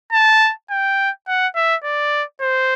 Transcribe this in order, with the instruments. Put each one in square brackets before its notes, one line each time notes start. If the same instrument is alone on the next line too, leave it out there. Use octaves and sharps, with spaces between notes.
[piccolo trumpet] A5
G5
F#5
E5
D5
C5